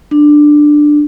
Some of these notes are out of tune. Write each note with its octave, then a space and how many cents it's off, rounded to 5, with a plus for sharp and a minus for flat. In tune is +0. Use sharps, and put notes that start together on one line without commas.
D4 +10